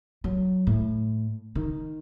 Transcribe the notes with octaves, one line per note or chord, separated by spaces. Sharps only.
F#3
A2
D#3